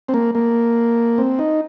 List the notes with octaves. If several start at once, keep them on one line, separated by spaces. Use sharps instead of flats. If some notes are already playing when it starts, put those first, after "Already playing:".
C4
A#3
A#3
C4
D#4